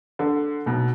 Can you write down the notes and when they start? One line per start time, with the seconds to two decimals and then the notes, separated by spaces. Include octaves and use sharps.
0.19 D3
0.66 B1 B2